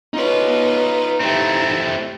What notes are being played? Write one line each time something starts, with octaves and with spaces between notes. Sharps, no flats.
D#4 F4 B4 C#5
A3 C4 E4 G4